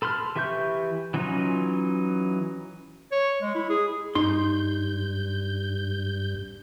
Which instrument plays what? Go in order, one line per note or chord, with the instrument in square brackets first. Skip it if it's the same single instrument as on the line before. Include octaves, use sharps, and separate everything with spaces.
[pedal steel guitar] A4 B5 C6 F6
E3 G4 E5 C#6 G6
E3 F#3 C#4 D#4 F4
[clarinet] C#5
G#3
E4
G#4
[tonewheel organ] G2 G6 [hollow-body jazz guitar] D#4 C6